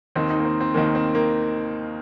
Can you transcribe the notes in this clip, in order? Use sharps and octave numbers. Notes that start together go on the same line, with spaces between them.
D#2 D#3 C4
D#4
A#3
C4
C4
D#2 D#3 A#3
C4
A#3